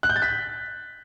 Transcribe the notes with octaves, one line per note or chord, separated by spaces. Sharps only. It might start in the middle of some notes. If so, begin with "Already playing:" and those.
F#6
G6
A6
B6